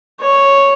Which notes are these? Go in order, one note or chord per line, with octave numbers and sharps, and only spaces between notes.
C#5